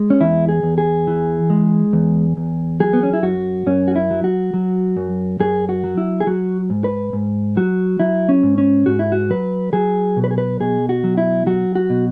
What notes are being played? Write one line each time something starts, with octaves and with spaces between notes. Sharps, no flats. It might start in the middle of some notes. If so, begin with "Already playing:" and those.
Already playing: G#3
C#4
E2 E4
G#4
E2
G#4
E3
G#3
E2
E2
F#3 G#4
B3
C#4
E4
F#2 F#4
F#2 C#4
F#4
E4
F#3
F#4
F#3
F#2
F#2 G#4
F#4
F#3
E4
G#4
F#3 F#4
G#2
B4
G#2
F#3 F#4
F#3 E4
C#4
G#2
C#4
G#2 F#4
E4
F#4
F#3 B4
F#3 G#4
B2
B4
G#4
B4
B2 G#4
F#4
F#3
E4
F#3 F#4
F#4
B2